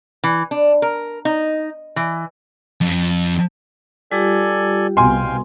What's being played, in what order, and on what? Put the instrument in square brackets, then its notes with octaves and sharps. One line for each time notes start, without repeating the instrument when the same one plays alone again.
[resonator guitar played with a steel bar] E3
D4
A#4
D#4
E3
[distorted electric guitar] F2
[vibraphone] G3 F4 G4 [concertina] A4 D5 G#5
[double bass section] C2 B2 [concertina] F5 G5 [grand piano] G#5 C6